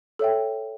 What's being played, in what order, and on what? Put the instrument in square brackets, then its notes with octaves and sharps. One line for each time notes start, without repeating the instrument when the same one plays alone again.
[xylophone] A4 C#5 E5 G5